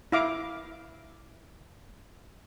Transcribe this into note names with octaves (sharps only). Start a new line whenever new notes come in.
E4 F5 D6